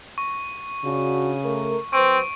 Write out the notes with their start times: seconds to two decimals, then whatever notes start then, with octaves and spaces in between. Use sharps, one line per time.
0.18 C#6
0.84 C#3 D4 F#4
1.43 A3 A#4
1.93 F#3 C4 B4 C5 C#6 D7